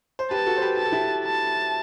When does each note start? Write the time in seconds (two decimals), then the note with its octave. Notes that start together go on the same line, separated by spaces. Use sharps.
0.19 C5
0.31 G4 B4 A5
0.46 F#4 A4
0.57 C5
0.62 G4 B4
0.77 G4 A5
0.85 A4
0.92 E4 G4
1.25 A5